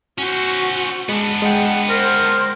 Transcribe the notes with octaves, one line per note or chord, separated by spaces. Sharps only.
C#4 F#4 C5
G#3 B3 D4
G#3 F#5 G5
A#4 C5